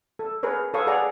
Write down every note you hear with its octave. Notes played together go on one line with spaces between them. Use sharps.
A4
G#4 A#4 B4 C#5
A4 B4 C#5 F5 C#6 D#6
G#4 D5 F#5 A5 A#5